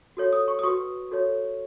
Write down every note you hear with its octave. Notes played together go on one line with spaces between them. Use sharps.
F#4 A4 C#5
D#6
C#6
D#6
F#4 B4 C#6
F#4 A4 C#5